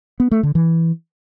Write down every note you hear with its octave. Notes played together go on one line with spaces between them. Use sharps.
B3
A3
D3
E3